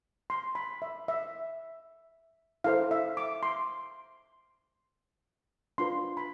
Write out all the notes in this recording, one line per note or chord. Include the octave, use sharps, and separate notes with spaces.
C6
B5
E5
E5
E4 A4 C5 F5
E5
D6
C6
D4 F4 B4 C6
B5